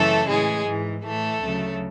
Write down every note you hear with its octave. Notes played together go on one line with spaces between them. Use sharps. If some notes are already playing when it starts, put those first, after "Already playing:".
Already playing: F#2 C#3 E3 A3 A4
A2 E3 G#3 G#4
G#2 E3
A2 E3 A3 A4
D2 C#3 F#3